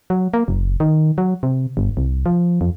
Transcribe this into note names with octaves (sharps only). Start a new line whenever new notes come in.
F#3
A#3
F#1
D#3
F#3
C3
G1
C2
F3
F2